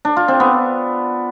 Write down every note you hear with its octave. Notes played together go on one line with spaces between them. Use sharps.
D4
F4
C4
B3